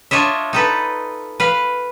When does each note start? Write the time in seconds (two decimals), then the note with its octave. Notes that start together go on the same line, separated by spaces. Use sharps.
0.11 D4 F4 C#5 D#5 E5
0.53 D#4 A4 B4
1.40 B4 F5